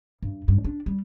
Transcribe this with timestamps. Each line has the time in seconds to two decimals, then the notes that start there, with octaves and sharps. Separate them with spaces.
0.23 G2
0.48 G2
0.64 D4
0.86 G3